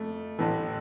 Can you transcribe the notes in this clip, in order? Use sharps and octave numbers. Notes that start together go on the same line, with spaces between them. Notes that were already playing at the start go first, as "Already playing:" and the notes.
Already playing: F2 A3
A1 A2 E3